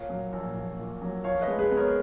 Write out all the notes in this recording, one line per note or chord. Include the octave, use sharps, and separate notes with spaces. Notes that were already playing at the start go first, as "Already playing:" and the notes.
Already playing: A#2 C#5 F5
F#3
A#1
A#1
A#2
F#3
F3 C#5 F5
B4 D#5
G#3
G#4 B4
B3
A#4 C#5